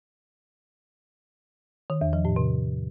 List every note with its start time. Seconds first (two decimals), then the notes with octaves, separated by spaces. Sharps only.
1.90 D#3
2.01 E2
2.13 F3
2.25 A2
2.36 C3